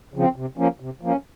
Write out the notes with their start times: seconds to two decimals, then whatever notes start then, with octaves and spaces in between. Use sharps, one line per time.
0.14 C#3 F3 C4
0.36 C3
0.57 F3 A#3 C#4
0.80 C3
1.01 F3 A#3 C#4